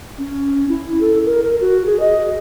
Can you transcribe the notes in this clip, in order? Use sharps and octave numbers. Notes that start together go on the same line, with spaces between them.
C#4
E4
A4
A#4
A#4
F#4
G#4
D#5